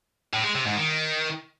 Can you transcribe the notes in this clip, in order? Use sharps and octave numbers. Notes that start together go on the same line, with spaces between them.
A2
G#3
C3
G#2
D#3